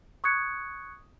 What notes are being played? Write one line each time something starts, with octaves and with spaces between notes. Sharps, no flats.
C#6 D#6 F#6 G#6 C#7